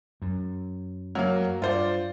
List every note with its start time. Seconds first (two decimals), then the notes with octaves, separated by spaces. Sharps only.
0.22 F#2
1.15 F#3 A#3
1.62 G2 F4 C5 D5